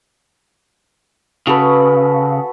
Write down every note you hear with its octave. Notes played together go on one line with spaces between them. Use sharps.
C#3 F#4 A4 B4